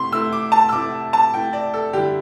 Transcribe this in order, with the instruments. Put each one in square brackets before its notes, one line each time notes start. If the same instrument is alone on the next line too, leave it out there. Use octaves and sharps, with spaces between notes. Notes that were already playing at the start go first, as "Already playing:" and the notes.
Already playing: [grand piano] C3 A3 E4 C6
C3 A3 E4 E6
D6
A5
E6
C3 A3 E4 D6
A5
C3 A3 E4 G5
D5
A4
D3 G3 E4 G4